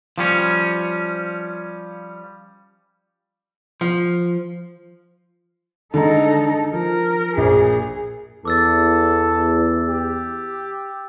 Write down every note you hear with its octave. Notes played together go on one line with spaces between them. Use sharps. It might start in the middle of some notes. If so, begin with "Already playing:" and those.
F3 G3 C#4
F3
D3 G#3 D#4 A4 A#5
F3 A#4
A#1 G#4
E2 A4 D6 E6 A6
G4